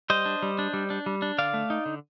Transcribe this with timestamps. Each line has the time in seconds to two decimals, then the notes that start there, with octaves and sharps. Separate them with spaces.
0.10 G3 C5 D#5
0.25 D4
0.43 G3
0.59 D4
0.73 G3
0.90 D4
1.06 G3
1.22 D4
1.38 D3 D5 F5
1.54 A3
1.70 D#4
1.86 D3